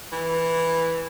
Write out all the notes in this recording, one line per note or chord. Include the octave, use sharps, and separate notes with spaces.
E3